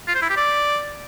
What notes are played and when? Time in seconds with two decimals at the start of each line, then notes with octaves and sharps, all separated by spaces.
0.07 F4
0.15 C5
0.22 E4
0.29 G4
0.37 D5